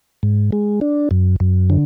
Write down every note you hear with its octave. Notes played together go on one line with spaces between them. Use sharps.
G#2
G#3
D4
F#2
F#2
D3